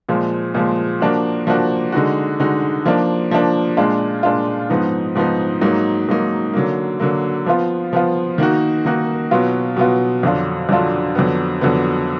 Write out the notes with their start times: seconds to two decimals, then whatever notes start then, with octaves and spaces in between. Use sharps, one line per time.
0.09 A#2 F3 G#3
0.54 A#2 F3 G#3
1.01 F3 A#3 D4 F#4
1.47 F3 A#3 D4 F#4
1.92 D3 G#3 D#4 F#4
2.40 D3 G#3 D#4 F#4
2.85 F3 A#3 D4
3.31 F3 A#3 D4
3.77 A#2 G#3 D4 F4
4.23 A#2 G#3 D4 F4
4.70 G#2 F3 B3 D#4
5.15 G#2 F3 B3 D#4
5.61 G#2 F#3 A#3 D#4
6.08 G#2 F#3 A#3 D#4
6.53 D3 F#3 A#3
7.00 D3 F#3 A#3
7.46 F3 B3 F4
7.93 F3 B3 F4
8.38 D#3 A#3 D#4 F#4
8.85 D#3 A#3 D#4 F#4
9.31 B2 F#3 B3 F4
9.76 B2 F#3 B3 F4
10.23 F2 D3 F#3 D4 F4
10.69 F2 D3 F#3 D4 F4
11.15 F2 D3 F#3 B3
11.61 F2 D3 F#3 B3